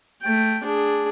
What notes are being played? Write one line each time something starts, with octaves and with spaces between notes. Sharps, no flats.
A3 G5
D4 G#4